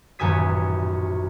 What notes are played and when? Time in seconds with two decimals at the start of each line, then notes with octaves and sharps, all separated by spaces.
0.19 D#1 A1 F#2 G#5 D#6 B6